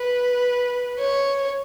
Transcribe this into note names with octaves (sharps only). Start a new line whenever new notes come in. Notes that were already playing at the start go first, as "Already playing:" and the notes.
Already playing: B4
C#5